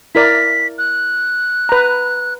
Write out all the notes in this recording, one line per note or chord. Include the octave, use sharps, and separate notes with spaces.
E4 A#4 D5 B6
F#6
B4 A#5